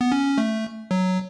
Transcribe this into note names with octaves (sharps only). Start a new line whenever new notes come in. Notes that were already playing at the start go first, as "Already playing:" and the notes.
B3
C#4
A3
F#3